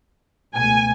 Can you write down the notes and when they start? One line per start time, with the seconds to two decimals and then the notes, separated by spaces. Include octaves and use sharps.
0.55 C#2 B2 A3 G#5